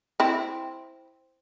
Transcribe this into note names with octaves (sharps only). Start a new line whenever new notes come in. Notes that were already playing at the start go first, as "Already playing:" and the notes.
C4 E4